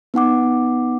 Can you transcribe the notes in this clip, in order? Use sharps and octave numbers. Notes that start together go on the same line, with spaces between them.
B3 D#4 F#5 D6